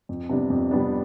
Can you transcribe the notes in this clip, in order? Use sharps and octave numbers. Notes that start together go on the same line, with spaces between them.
F2
C3 G3 B3 D4
F2
C3 G3 B3 D4